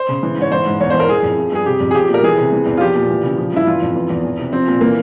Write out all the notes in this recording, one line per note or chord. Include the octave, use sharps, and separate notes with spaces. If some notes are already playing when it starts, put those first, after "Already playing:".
Already playing: C5
C#3
E3
G#2 C#5
E3 C5
G#2
E2 C#5
C5
E3
A#4
E3 G#4
F2
F3
G2 G#4
C3 G4
F2
G#4
F3 G4
G4
A#2
A#4
E3 G#4
C3
E3
E2
F4
F3 G4
A#2
E3
C#3
F3
G2 E4
E3 F4
F2
E3
E2
E3
C3
F3 C4
A#2
E3 A#3